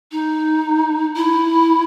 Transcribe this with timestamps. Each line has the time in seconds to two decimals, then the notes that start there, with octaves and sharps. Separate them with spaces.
0.12 D#4
1.16 E4